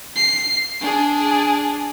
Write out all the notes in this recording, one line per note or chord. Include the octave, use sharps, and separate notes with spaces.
C7
D4 G#4